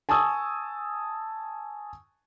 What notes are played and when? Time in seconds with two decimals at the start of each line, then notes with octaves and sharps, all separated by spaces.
0.09 G#5 A5 C#6 D#6 E6